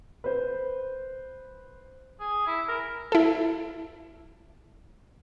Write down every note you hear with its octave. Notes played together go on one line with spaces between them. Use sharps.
B4 C5
G#4
E4
A#4
E4 A4